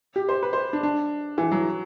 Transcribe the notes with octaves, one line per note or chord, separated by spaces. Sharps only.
G4
C5
B4
C5
D4
D4
E3
F#3